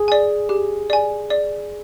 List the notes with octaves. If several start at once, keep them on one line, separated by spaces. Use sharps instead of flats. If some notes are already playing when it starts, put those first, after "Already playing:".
Already playing: G#4
D5 G#5
G4
D5 G#5
D5